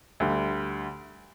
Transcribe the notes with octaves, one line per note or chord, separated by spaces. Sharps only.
D2 D3 G3